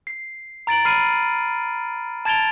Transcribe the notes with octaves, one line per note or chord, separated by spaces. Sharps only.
C7
A#5 A6 D7 F#7
B5 F6 C7 D#7
A5 G#6 A6 D7 F7 G7